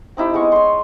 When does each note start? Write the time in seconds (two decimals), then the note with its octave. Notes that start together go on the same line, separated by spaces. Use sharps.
0.17 C4 D#4 E4 G4
0.34 G#3 B3 D#5 C#6
0.52 C#5 C6